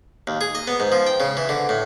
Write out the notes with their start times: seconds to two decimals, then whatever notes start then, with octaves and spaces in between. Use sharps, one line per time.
0.27 D#2
0.41 G#4
0.55 D#5
0.67 B3
0.80 G#2
0.92 F3
1.07 G5
1.20 C#3
1.37 E3
1.49 D3
1.69 A2